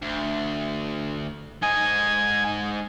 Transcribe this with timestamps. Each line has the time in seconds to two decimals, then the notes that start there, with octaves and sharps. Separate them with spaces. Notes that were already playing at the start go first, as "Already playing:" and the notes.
0.02 D2
1.62 G#2 D#5 G#5